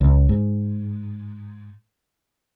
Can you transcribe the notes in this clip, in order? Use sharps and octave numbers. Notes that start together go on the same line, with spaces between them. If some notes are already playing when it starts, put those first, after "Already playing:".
C#2
G#2